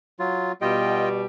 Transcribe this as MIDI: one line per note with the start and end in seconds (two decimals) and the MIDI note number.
0.20 0.52 54
0.20 0.52 65
0.62 1.25 47
0.62 1.25 55
0.62 1.09 65
0.62 1.09 75
0.62 1.09 79